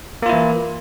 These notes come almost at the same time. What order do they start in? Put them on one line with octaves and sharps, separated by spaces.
A#3 F4 E4 E3